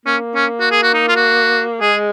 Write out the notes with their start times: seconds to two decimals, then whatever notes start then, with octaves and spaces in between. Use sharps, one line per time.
0.06 A#3 C#4
0.35 C#4
0.60 F#4
0.71 G#4
0.83 F#4
0.94 D#4
1.08 F4
1.16 F#4
1.81 G#3 G#4